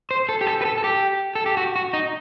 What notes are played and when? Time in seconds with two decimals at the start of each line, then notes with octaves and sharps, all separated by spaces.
0.11 C5
0.29 A4
0.41 G4
0.47 A4
0.62 B4
0.65 A4
0.78 A4
0.84 G4
1.35 A4
1.46 G4
1.57 F#4
1.76 F#4
1.93 D#4